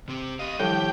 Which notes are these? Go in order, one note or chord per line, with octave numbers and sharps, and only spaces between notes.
C3 C4 G4
G4 D#5 F5
A2 D3 D#3 F3 G3 E4 G4 G5